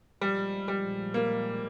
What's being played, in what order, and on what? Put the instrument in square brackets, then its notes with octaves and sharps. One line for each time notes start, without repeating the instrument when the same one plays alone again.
[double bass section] A#2 F3 G#3 [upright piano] G3
[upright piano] G3
A#3